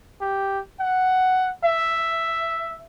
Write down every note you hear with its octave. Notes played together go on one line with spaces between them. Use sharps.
G4
F#5
E5